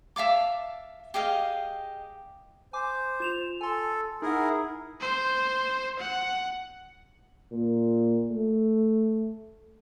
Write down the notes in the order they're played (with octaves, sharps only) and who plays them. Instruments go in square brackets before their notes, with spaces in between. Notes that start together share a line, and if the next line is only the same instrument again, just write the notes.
[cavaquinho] E5 F5 A5 D6
G4 G#4 D#5 F5
[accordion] C5 [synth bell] G#5 D6
[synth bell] F4 E7 F7
[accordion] A4 [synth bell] G#5 C6
[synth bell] D#4 F#5 [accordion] E4 G#4 A#4
[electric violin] C5
F#5
[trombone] A#2
A3